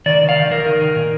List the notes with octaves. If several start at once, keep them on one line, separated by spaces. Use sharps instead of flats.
D#3 D5
D#3
F5
D#3
D#3 A#4
D#3
D#3
A#2